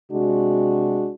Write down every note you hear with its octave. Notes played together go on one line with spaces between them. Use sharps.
C3 G#3 D4 F#4